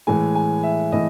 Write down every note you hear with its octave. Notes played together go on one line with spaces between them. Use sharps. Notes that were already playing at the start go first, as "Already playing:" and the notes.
A2 E3 G#3 G#5
G#5
E5
A2 E3 D#5